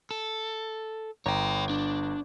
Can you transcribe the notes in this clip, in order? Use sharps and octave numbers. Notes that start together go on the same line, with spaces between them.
A4
G1 C#5 G5 A#5
D4